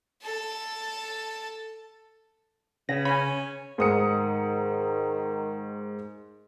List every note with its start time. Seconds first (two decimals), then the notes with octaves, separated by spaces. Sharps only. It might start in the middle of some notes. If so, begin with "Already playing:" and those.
0.23 A4 A5
2.89 C#3 B4 A#6
3.05 C#4 G#5 B5
3.78 G#2 D#3 D#6 C#7